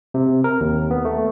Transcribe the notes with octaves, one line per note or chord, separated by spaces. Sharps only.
C3
A#4
D#2
B3
A3